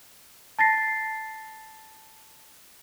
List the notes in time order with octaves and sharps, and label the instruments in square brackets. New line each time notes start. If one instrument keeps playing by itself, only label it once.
[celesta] A5 A6 A#6 C7